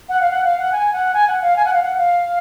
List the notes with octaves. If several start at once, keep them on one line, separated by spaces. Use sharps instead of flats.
F#5
F5
F#5
F5
F#5
G#5
F#5
G#5
F#5
F5
G#5
F#5
F5
F#5
F5